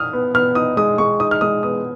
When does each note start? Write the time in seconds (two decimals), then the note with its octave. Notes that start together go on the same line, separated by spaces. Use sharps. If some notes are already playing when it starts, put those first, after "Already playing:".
Already playing: D#6 F6
0.13 B3
0.34 B3 F6
0.55 D#4 D#6
0.77 G#3 D#6
0.98 G#3 C#6
1.20 D#4 D#6
1.31 F6
1.41 G#3 D#6
1.63 B3 D#6